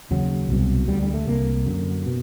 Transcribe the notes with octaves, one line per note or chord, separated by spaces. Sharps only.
D#2 C#3 F#3
C2 B2
D2 D3 G3
G3
A3
C2 C3 A#3
F#2 D3
B2